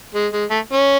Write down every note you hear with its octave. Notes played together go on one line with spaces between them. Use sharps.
G#3
G#3
A3
C#4